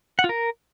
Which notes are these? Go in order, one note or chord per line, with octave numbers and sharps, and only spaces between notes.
F#5
F4
A#4